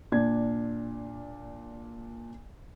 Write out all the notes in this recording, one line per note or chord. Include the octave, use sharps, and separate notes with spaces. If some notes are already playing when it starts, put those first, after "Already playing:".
A#2 D4 G#6